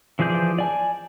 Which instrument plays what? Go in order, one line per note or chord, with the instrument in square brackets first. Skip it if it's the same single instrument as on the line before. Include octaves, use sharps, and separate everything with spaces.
[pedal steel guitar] E3 F3 G#4 D5 G6
D5 G#5 A5